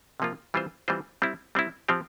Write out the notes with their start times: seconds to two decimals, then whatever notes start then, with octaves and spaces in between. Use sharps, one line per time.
0.20 C3 F3 A#3 F4
0.54 E3 G3 C4 F4 C5
0.88 E3 G3 C4 F4 C5
1.22 G3 C4 E4
1.55 G3 C4 E4
1.88 F3 C4 G4